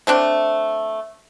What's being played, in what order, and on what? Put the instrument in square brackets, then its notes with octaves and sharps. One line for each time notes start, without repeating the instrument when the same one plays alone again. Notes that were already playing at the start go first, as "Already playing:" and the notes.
[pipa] A3 C4 D4